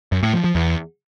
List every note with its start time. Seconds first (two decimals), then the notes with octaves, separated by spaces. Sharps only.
0.12 F#2
0.23 A2
0.33 F3
0.44 F3
0.55 E2